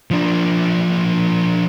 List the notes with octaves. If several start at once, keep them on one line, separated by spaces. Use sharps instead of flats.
F3 D4